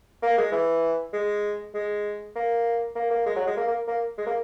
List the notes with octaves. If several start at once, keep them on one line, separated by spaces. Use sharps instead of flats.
A#3
G#3
E3
G#3
G#3
A#3
A#3
A#3
G#3
F#3
G#3
A#3
A#3
A#3
G#3
A#3